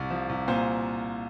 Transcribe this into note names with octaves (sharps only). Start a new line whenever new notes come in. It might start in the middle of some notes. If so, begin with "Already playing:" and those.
Already playing: C2
F3
C2
A#2 C5